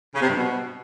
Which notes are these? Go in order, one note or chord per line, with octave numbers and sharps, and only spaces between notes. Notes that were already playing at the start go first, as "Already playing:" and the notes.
C#3
C3
G2
B2